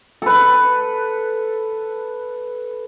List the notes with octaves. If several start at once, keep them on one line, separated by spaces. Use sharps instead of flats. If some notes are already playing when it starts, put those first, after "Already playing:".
A4 B4